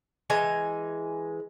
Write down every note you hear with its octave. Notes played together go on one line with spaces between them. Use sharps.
E3 G#3 G#5 A#5